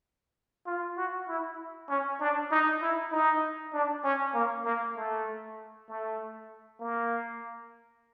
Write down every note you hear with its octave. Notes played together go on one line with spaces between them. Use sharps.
F4
F#4
E4
C#4
D4
D#4
E4
D#4
D4
C#4
A#3
A#3
A3
A3
A#3